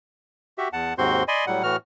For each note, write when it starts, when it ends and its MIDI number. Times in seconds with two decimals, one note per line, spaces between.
0.58 0.68 66
0.58 0.68 67
0.58 0.68 76
0.73 0.94 40
0.73 0.94 78
0.73 0.94 81
0.98 1.23 39
0.98 1.23 44
0.98 1.23 60
0.98 1.23 66
0.98 1.23 84
0.98 1.23 91
1.28 1.45 74
1.28 1.45 75
1.28 1.45 80
1.28 1.45 83
1.28 1.45 84
1.47 1.63 45
1.47 1.63 54
1.47 1.63 55
1.47 1.63 78
1.63 1.76 45
1.63 1.76 52
1.63 1.76 66
1.63 1.76 89